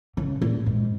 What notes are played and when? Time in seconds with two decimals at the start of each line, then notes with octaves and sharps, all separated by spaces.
0.17 C#3
0.42 A#2
0.66 G#2